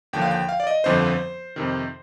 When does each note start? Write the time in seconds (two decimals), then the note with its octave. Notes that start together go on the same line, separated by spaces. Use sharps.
0.13 D#2 D3 F3 G5
0.22 F5
0.31 G5
0.49 F5
0.60 D5
0.67 D#5
0.84 G1 F2 D3 F3 C5
1.56 F2 C3 D#3